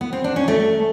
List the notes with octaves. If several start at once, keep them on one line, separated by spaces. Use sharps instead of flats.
B3
C4
D4
C#4
A3